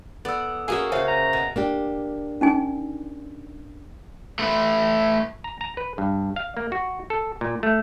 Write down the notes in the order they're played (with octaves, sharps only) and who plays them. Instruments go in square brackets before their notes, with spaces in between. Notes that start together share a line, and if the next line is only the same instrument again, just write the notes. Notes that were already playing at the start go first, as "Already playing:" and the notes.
[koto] B3 [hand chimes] A4 E6 [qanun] D5
[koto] A#3 E5 [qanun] C#4 F#4 F5 [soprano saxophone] G#4
[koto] C#3 [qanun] G#4 [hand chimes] C5 C#5 E5 [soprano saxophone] F5
[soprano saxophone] A#5
[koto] B2
[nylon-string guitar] A#3 D4 G4
[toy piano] C#4 D#4 G#5
[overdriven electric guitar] A3 B4
[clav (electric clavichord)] A#5
A#5
B4
G2
F5
A#3
F#4
A4
A#2
A3